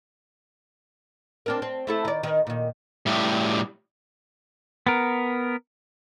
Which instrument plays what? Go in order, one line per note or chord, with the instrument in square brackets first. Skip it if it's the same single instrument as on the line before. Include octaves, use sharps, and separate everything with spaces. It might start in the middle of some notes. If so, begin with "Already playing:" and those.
[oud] C4 D4 A#4
C4
A3 E4 A4
D#3 D5
D#3
A#2 D#3
[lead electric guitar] A2 G3
[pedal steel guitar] B3 A#4